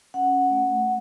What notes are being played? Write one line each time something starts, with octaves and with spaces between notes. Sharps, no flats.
C#4 F#5
A3